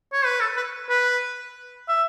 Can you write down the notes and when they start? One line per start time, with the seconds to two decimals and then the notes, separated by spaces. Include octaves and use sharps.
0.13 C#5
0.26 B4
0.40 A4
0.57 B4
0.89 B4
1.88 E5